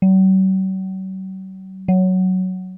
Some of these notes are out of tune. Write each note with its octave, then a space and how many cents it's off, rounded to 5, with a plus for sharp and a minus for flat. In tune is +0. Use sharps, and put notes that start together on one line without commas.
F#3 +45
F#3 +5